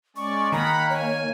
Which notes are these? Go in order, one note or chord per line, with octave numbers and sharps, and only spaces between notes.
G#3 C#4 D5 C#6
D#3 A#3 F#5 A#5 B5
C#5 G#5